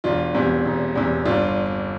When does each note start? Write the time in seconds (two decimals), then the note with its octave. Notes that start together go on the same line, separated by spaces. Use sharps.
0.04 E1 D4 F4
0.34 E2 C3
0.65 E1
0.95 E2 C3
1.25 G1 D4 F4